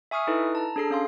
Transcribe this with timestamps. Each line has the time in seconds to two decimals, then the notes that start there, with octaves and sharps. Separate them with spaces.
0.11 E5 G#5 C#6 D#6 F6 C7
0.27 D#4 E4 A4 B4
0.55 A5 A#5
0.76 D4 G#4 A4 C7
0.90 C#4 F5 C6